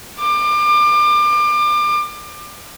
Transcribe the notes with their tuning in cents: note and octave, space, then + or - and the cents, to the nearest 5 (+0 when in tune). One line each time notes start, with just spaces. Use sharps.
D6 +30